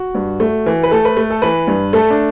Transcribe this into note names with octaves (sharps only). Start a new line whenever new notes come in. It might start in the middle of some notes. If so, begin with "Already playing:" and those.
Already playing: F#4
G2
A3
E3
B4
A3 A4
B4
A3
A4
E3 B4
G2
A3 A4
D4